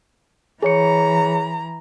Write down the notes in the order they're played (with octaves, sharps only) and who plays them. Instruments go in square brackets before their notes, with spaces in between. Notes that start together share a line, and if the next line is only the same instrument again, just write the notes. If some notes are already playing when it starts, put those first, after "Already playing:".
[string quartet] E3 A#5 [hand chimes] G#4 C#5 C#7